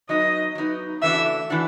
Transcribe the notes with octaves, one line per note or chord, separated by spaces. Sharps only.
F#3 B3 D#4 D#5
F#3 B3 D#4
C#3 E3 A3 D4 F#4 E5
E3 A3 D4 F#4